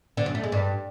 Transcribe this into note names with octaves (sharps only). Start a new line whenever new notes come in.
D3
F#2
A3
G#3
G2